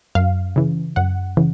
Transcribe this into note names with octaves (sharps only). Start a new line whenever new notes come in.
F#2 F5
C#3 E3
F#2 F#5
C#3 E3